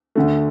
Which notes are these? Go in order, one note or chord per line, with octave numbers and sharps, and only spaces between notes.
D2 D3 A3